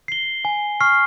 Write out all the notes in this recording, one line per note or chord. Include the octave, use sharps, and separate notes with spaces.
C7 G7
G#5
C#6 F6 C7